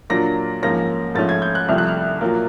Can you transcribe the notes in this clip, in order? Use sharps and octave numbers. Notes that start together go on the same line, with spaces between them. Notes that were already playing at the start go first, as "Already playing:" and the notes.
A#2 F#3 A#3 D4 A#6
G#2 F3 A#3 C#4 A#6
G#2 F3 A3 C#4 A6
G#6
G6
F#6
C2 C3 F3 A3 F6
F#6
F6
A#2 F#3 A#3